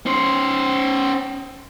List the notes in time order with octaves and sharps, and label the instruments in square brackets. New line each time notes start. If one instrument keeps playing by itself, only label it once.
[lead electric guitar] C#4 C5